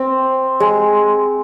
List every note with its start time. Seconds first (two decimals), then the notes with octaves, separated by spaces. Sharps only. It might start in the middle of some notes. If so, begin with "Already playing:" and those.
Already playing: C4
0.60 G#3